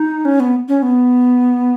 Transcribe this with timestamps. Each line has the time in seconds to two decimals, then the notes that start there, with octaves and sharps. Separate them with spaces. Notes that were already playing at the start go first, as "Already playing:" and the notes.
Already playing: D#4
0.25 C#4
0.40 B3
0.68 C#4
0.83 B3